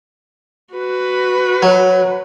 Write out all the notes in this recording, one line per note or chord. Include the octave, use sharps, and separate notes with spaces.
F#4 B4
F#3